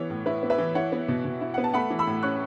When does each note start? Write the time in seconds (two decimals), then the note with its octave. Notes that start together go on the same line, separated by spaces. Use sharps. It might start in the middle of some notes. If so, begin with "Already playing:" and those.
Already playing: E3 B3 C#5
0.10 A2
0.26 E4 B4
0.43 B3
0.50 B4 E5
0.58 E3
0.75 E4 C#5 F#5
0.92 B3
1.08 B2
1.25 B2
1.41 E4
1.54 B3 F#5
1.64 A5
1.74 A3 F#5 B5
1.90 E3
1.99 B5 E6
2.07 A2
2.23 C#4 C#6 F#6